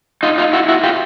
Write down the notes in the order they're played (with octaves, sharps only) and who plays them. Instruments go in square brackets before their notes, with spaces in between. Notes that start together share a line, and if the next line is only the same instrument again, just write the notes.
[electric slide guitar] D#4 F4
D#4 F4
E4 F#4
E4 F#4
F4 G4